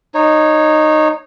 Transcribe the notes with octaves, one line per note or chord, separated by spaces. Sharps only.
D#4 C#5